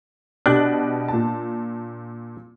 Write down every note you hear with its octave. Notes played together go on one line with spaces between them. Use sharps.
B2 D4 G4 F#6
A#2 A5